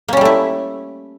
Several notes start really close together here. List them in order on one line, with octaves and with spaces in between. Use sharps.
A#3 C#4 G3 A3 E4